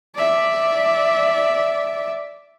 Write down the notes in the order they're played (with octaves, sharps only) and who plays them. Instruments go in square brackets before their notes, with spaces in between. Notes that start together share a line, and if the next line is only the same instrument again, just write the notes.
[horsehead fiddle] D5 E5